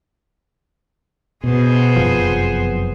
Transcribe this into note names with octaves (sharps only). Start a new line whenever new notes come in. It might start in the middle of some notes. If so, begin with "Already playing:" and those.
B2 B3 G#4 C5
F#1 F2 C3 F3